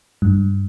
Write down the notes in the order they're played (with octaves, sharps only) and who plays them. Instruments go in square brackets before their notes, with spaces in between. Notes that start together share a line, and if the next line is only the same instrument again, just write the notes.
[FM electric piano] G2